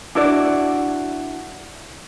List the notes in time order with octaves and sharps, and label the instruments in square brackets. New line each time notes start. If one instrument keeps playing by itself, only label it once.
[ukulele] D4 E4 F#4 D5